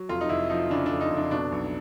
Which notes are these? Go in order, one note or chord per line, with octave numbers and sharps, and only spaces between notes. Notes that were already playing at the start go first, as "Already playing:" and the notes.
Already playing: F#3
F1 F4
D#4
F1 E4
F3 D#4
C#3 D4
F1 D4
D#4
F1
D4
B2 D4
B1